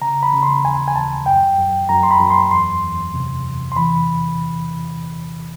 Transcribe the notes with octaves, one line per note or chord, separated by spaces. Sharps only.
C#3 A#5
B5
C#3
C6
D#2 G#5
G#5
D#2 A5
F#2 G5
F#2
F#2 A#5
C6
B5
F#2
C6
E2 C6
E2
C3
E2
C6
E3 B5